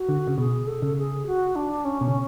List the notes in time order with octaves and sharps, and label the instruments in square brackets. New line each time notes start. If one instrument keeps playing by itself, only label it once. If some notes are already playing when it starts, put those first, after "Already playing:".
Already playing: [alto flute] F#4
[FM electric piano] D3
C#3
[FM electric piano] B2 [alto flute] G#4
[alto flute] A4
[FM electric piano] C#3
[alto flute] G#4
F#4
D4
C#4
[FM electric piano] B2
C#3